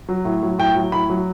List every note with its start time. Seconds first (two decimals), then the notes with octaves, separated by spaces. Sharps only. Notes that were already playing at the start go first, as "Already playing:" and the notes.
0.09 F#3
0.25 A2
0.43 F#3
0.59 A2 G5
0.75 F#3
0.92 A2 B5
1.10 F#3